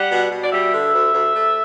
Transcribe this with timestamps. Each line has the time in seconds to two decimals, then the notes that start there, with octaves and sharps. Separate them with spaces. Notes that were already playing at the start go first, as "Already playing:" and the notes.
Already playing: G3 F#5
0.10 B2
0.30 B2
0.43 D5
0.52 G3 E5
0.73 D3
0.93 D2
1.14 D2
1.35 A3